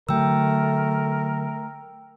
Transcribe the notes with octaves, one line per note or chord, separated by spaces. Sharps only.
D3 F#3 A3 A#4 G5 E6